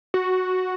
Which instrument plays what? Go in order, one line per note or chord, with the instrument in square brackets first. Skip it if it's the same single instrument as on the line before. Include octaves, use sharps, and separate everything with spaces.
[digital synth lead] F#4